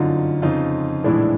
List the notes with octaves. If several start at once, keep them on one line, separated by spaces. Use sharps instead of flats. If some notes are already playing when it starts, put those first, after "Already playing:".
Already playing: G1 F#2 D3 D#4 F4
F2 C#3 F3 D#4 F4
A#1 A2 E3 G#3 D4 E4